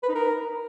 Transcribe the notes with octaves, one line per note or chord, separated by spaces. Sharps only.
B4
D#4
A#4